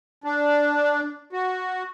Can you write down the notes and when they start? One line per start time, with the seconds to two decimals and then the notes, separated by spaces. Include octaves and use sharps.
0.24 D4
1.33 F#4